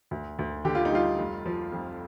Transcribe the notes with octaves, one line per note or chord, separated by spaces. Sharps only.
D2
D2
D3 G4
F4
D#4
G3 F4
F1
F3
F2